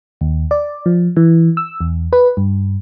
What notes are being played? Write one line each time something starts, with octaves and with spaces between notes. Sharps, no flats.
D#2
D5
F3
E3
E6
E2
B4
G2